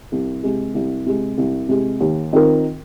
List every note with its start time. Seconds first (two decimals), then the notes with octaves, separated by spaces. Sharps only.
0.12 C2
0.43 C3 G#3
0.74 C2
1.06 C3 G#3
1.38 C2
1.69 C3 G#3
2.00 D#2
2.33 D#3 C4 F4 A#4